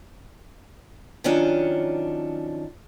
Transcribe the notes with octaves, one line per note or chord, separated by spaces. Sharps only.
D#3 F3 F#3 C#4 D4